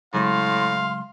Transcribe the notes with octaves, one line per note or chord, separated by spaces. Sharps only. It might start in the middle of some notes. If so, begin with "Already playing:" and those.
A2 C#3 F#3 G#3 F5 C6